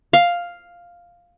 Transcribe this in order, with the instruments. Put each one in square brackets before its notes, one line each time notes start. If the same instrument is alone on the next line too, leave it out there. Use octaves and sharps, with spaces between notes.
[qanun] F5